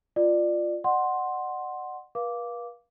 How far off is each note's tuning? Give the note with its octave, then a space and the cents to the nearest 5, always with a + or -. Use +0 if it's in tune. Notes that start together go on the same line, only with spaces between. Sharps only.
F4 +0 D5 +20
D5 +45 F#5 +0 C6 +10
B4 -45 F5 +0 D6 -10